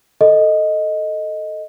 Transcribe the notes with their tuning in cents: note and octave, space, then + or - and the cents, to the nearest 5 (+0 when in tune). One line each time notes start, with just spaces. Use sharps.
A4 +0 D#5 +0